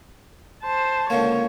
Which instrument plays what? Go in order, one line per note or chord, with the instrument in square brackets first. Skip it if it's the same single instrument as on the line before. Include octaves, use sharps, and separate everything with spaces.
[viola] C5 A5
[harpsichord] C#2 D3 A#3 [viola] C#5